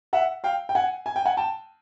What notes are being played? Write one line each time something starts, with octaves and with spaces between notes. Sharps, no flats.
E5 F#5
F5 G5
G5
F#5 G#5
G#5
G5
F#5 G#5
G5 A5